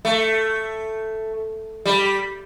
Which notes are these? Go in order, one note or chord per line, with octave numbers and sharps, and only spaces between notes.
A3
G3